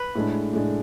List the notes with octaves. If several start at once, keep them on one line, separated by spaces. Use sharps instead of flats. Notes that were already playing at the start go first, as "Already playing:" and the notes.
Already playing: B4
A2 G#3 D4
A2 G#3 D4